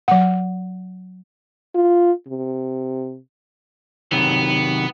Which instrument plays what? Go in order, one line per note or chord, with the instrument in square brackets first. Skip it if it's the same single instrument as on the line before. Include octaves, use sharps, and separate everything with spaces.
[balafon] F#3 F#5
[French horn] F4
C3
[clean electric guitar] C3 D#3 F#3 [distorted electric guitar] B3